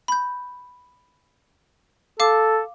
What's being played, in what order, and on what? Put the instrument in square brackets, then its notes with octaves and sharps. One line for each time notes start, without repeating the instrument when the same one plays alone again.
[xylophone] B5 G6
[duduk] A4 [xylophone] F5 D6